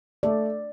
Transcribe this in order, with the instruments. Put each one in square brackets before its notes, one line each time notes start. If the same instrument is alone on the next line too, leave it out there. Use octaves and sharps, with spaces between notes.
[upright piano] A3 [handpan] D5